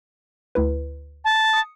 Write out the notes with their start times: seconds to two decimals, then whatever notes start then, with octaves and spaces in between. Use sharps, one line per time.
0.55 D2 E4 B4
1.25 A5
1.53 D#6 C#7